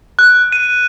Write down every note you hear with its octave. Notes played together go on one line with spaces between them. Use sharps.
F#6
D#7